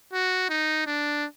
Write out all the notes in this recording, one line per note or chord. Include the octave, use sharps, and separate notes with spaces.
F#4
D#4
D4